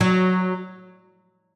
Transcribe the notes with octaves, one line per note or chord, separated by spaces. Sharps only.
F#3